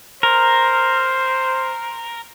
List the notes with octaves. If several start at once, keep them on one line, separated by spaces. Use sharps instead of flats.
A#4 C5